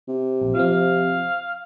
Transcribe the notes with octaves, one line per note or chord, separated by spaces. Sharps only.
C3
A#1
F3 C4 F5